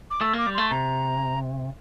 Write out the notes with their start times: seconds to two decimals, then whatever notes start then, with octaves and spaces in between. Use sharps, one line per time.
0.11 D6
0.21 A3 E6
0.33 A#3 D6
0.46 G3
0.55 A3 C6
0.71 C3 A#5